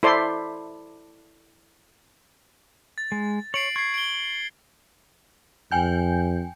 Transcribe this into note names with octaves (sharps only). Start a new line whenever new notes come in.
E4 A4 C5 D5 C6
A6
G#3
C#5 C7 D7 F#7
C#6 G#6 C7
D7 G7
F2 G5 G#5 G6